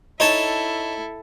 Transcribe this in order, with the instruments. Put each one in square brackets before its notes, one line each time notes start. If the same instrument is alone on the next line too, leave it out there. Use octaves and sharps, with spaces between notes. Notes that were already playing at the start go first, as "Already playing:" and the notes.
[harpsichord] D#4 C#5 A5 [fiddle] E4 A4